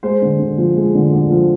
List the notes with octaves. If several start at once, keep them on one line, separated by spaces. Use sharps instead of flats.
G#3 C5
D3
D3
F3
G#3
D3
D3
F3